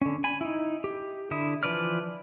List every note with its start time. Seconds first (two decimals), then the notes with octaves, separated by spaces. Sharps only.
0.02 D3 C#4
0.24 G#5 B5
0.41 D#4 E4
0.84 G4
1.31 D3 E4 D#6
1.63 E3 F3 B4 D5 F6